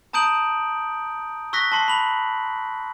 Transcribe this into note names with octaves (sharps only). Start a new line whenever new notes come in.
A5 A#5 D#6 G6 D7 F#7
C#6 E6 F#6 A#6 B6
A5 C6 C7
B5 F#7